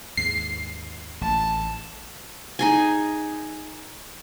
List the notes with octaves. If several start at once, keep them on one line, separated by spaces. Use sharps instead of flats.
D#2 G#2 C7
A1 A5
D#4 G#4 G#5